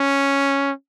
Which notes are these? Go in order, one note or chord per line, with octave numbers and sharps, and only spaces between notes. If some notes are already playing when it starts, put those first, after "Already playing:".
Already playing: C#4